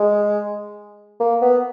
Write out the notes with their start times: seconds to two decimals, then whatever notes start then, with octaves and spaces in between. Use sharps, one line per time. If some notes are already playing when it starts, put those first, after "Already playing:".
Already playing: G#3
1.20 A#3
1.42 B3